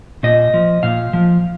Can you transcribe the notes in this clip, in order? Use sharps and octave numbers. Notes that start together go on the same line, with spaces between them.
A#2 D#5
F3
A#2 F5
F3